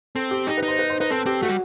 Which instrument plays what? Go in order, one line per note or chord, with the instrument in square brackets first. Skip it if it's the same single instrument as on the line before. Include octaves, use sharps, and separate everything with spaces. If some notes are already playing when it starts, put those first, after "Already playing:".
[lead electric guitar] C4 [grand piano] A4
[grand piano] G4
[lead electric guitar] D#4 [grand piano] G4
[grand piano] B4
[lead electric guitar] D#4
[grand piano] C5
B4
C5
[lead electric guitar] D#4 [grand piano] B4
[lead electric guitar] C4 [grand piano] A4
[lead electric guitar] C4 [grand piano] G4
[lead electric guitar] A3 [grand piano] F#4
[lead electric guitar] G3